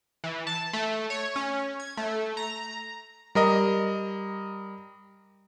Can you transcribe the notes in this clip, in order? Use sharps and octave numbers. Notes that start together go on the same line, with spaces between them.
E3
A5
A3
C#5
C#4
G#6
A3
A#5
G3 A#4 D#5